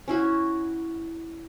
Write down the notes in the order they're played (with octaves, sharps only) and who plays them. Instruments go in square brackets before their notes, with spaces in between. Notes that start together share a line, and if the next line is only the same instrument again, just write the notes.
[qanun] C#4 E4 F#4